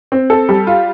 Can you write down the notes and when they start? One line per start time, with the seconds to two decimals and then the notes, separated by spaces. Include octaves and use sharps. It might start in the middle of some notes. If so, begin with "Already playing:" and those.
0.12 C4
0.30 A4
0.49 G3
0.67 F4